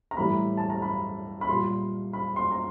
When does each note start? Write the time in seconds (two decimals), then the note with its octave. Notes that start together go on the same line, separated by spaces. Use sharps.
0.11 A#5
0.17 A2 E3 G3 B5
0.57 A5
0.70 A#5
0.82 B5
1.41 B5
1.49 A#2 G3 C6
2.13 B5
2.36 C6
2.52 A#5